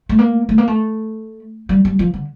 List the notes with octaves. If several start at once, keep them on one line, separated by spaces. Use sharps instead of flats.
A3
A#3
A3
A#3
A3
G3
G3
F3
D3